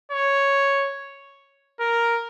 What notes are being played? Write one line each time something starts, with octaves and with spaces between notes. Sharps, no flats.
C#5
A#4